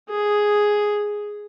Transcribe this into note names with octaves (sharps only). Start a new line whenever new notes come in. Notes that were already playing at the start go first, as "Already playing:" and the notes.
G#4